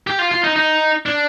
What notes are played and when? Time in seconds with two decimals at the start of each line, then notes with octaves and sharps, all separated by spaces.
0.07 G4
0.19 F4
0.32 F4
0.44 D#4
0.56 D#4
1.06 D4